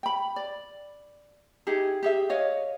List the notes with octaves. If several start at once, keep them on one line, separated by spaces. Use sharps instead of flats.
G5 B5
D5
D#4 E4 G4 G#4
G4 G#4 E5
C#5 D#5 F5